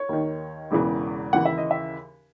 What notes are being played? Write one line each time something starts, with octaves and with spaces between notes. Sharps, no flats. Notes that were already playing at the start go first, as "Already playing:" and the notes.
Already playing: C#5
D#2 D#3
E1 E2 C#3 E3
D#2 C#3 E3 F#5
E5
D#5
E5